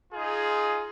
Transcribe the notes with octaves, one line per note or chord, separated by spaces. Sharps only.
D#4 F4 G#4